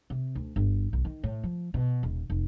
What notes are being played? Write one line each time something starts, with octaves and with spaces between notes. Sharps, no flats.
C3
D2
G1
B1
D#3
A2
F3
B2
D#1
F1